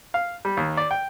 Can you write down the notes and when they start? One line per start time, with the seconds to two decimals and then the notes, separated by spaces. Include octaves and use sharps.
0.14 F5
0.45 G3
0.57 D#2
0.77 D5
0.91 G5